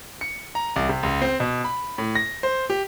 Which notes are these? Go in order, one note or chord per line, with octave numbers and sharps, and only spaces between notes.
C#7
A#5
C2
C3
C#2
C4
B2
B5
A2
A#6
C5
G4